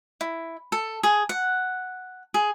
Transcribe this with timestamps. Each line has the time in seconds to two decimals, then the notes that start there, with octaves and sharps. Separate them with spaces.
0.21 E4
0.72 A4
1.03 G#4
1.29 F#5
2.34 G#4